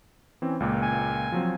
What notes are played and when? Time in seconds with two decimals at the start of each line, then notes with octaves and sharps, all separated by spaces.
0.42 E3 C4 C#4
0.60 C#2 A#2 A#3
0.82 G#5
1.32 F3 F#3 C4